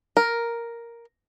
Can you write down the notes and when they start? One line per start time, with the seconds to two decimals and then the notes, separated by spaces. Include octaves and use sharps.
0.17 A#4